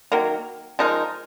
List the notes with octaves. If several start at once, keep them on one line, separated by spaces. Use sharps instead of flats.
D#3 F#3 A#3
F3 G#3 D#4 A#4